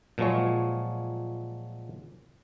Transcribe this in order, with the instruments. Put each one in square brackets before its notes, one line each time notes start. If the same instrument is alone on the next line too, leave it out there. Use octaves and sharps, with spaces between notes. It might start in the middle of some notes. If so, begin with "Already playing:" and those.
[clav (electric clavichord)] A#2 F3 F#3 G#3 C#5